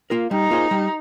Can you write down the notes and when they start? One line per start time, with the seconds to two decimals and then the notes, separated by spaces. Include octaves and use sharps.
0.10 A#3 F4 A#4
0.31 G3 D#4
0.51 A#3 F4 G#4 C5
0.71 G3